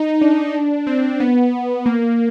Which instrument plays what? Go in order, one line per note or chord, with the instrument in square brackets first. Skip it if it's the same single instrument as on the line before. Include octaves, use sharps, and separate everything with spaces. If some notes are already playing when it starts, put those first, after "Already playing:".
Already playing: [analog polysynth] D#4
D4
C4
B3
A#3